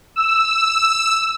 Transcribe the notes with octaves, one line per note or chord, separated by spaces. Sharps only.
E6